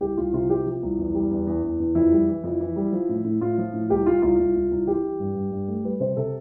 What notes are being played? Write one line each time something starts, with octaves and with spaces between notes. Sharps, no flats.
C2 G4
C2 F4
C3 F4
F3 G4
F3
C2
E2
G3
E2
E2
E2
E2
F2 E4
G3
E3
F2
E3
G3
F3
A2
A2
A2 F4
F3
A2
C2 G4
C2 F4
C2 F4
C2
C2
C2
E3 G4
E3
G2
G2
G2
A3
G3 B4
C3 C5
C3 A4